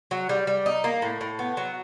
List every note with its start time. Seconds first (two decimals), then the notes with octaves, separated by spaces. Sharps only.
0.11 F#3
0.29 G3
0.47 G3
0.66 D#4
0.84 A#3
1.02 A2
1.21 A2
1.39 B3
1.57 F#3